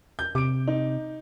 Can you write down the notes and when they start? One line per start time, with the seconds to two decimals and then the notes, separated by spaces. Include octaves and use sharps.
0.19 G6
0.35 C3 D6 D7
0.67 D#4